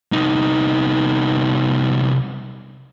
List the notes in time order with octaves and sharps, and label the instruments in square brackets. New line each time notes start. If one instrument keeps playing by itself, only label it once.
[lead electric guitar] C2 D#4